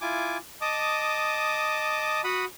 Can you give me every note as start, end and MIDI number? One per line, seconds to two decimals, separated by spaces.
0.01 0.37 64
0.01 0.37 65
0.01 0.37 80
0.01 0.37 86
0.61 2.21 75
0.61 2.21 81
0.61 2.21 86
0.61 2.21 87
2.24 2.45 66
2.24 2.45 78
2.24 2.45 83
2.24 2.45 87